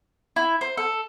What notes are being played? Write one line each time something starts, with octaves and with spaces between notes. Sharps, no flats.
E4
C5
A4